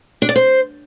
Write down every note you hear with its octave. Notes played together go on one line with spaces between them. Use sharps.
D4
D5
C5